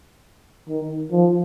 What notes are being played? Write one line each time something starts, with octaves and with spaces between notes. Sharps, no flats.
D#3
F3